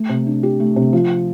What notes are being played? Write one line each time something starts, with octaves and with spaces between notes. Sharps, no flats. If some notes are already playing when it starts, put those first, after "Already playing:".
Already playing: A3
C3
D4
G4
A3
C3
F3